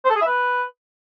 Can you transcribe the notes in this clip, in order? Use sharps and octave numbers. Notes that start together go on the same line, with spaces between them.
C5
A4
G#4
E5
B4